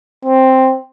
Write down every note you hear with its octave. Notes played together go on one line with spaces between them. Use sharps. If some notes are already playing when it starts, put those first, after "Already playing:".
C4